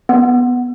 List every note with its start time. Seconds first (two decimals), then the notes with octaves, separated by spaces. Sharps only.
0.09 B3